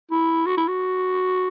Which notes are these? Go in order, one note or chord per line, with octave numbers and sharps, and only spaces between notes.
E4
F#4
E4
F#4